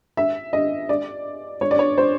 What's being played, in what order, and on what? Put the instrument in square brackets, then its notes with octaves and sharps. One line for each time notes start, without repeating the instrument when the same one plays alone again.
[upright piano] E5
D#5
D5
C#5
D5
C#5
C5